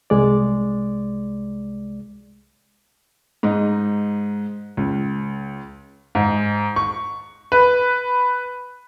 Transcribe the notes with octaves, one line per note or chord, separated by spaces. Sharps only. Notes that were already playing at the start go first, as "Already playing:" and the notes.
C2 G#3 D5
G#2 D#4 D#5
C#2
G#2
C#6
B4